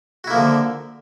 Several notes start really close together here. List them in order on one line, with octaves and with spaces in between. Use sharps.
F#4 E4 A#3 F3 D3